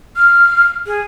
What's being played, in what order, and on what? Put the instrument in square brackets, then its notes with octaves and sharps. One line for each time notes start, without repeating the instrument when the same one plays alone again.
[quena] F6
G#4